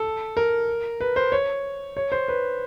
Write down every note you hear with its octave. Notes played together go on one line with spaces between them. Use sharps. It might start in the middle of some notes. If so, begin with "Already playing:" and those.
Already playing: A4
A#4
B4
C5
C#5
C#5
C5
B4